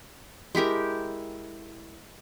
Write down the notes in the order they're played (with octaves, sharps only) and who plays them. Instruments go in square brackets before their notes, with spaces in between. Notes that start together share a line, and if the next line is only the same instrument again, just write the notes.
[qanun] G#3 E4 G4 A#4